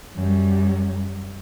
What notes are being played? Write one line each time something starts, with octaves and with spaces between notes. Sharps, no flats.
F#2 G3